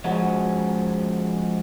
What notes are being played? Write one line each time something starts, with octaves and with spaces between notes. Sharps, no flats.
F3 G#3 C#4 F#4